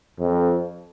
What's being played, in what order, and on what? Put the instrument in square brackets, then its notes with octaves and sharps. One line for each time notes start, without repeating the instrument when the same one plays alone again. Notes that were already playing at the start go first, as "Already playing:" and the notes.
[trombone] F2